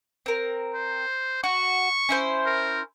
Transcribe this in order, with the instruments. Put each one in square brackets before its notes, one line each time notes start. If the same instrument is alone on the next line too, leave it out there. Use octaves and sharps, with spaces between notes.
[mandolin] C4 A#4
[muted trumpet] C5
[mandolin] F#4 [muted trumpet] C#6
[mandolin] C#4 E4 C5
[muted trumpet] A#4